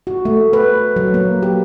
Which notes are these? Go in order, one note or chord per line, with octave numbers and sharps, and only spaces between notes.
F#4
A3
B4
F#3
A#3
G4